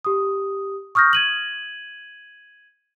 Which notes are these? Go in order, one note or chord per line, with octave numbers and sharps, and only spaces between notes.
G4 D#6
C#6 D#6 F6 G6 A#6
G#6 D#7 F#7